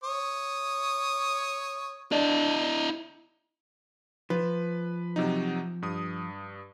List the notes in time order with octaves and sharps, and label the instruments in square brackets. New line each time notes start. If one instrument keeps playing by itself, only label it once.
[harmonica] C#5 D#6
[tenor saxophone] D4 [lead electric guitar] E4 D#5
[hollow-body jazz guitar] F3 [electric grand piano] B4
[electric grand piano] C3 F#3 D#4
G2 D#6